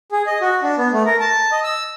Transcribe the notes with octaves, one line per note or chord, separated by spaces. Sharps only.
G#4
D#5
F#4
D4
B3
A3
A#4
A5
D#5
E6